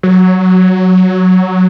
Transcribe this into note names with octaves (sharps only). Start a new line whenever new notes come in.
F#3